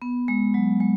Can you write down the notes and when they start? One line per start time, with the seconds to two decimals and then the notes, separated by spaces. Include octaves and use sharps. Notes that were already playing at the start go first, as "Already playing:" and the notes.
0.02 B3
0.28 G#3
0.54 F#3
0.80 G#3